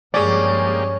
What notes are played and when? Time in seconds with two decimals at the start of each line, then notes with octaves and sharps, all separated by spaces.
0.14 G2 F3 G#3 A#3 C#4 G4 G#4 D5